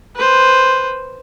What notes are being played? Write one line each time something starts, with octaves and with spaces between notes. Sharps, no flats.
B4 C5